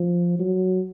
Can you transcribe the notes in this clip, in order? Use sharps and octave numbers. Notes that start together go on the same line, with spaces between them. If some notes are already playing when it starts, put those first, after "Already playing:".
Already playing: F3
F#3